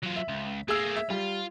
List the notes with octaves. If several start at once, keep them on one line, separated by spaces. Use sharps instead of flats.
F#3 F4
E5
C#2
A3 A#3 G#4 E6
E5
G3 F4